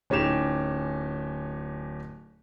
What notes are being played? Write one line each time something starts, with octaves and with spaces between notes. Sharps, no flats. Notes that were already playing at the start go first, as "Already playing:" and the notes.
D1 C#4 D#4 G4 E7 F7